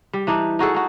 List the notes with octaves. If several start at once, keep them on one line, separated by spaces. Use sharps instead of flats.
G3
E3 D4 D#4
D#4 F#4 G#4 A4
D#4 F#4